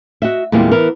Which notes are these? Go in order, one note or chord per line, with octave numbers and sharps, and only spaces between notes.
F#4 D#5 E5
E2 A#2 G3 G#3 A#3 C4
E3 B3 A#4